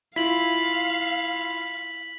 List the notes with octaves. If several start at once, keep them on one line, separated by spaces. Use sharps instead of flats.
E4 F4 F5 B6 F#7